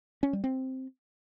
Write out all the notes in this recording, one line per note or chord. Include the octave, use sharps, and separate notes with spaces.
C#4
G3
C4